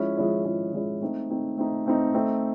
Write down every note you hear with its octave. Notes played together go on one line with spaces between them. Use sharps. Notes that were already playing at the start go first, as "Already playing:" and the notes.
Already playing: F3 G#3 C#4 E4
F3 G#3 C#4 E4
F3 G#3 C#4 E4
F3 G#3 C#4 E4
A3 C4 D#4
A3 C4 D#4
A3 C4 D#4
A3 C4 D#4
A3 C4 D#4